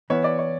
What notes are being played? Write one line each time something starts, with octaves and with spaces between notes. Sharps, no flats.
E3 B3 E4 C#5
D5
C#5